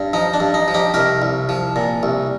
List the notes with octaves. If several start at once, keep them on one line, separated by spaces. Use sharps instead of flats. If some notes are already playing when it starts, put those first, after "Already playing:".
Already playing: G2
F3 D#4
D4
G2
D#4
F3
D#4 G4
C2 G4 A#4
C2
F3
A#2
C2